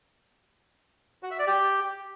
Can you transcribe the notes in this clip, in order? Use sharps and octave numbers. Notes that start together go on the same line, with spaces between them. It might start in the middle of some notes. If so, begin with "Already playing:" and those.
F#4
E5
D5
G4